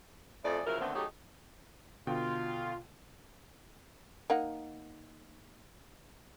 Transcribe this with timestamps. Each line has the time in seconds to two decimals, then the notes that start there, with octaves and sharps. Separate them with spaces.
0.44 F2 A3 E4 G#4 D5
0.66 C#3 F3 F#3 E4 A#4
0.80 D3 D#3 A3 B3 C4
0.94 F#3 A3 C#4 D#4 G4 G#4
2.07 B2 D3 F4 G5
4.30 A#3 D#4 F#5